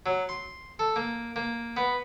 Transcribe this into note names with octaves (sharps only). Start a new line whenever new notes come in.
F#3
C6
A4
A#3
A#3
B3